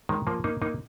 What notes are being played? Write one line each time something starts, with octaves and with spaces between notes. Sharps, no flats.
D#3 G#3
F3 A#3
A#3 D#4
A#3 D#4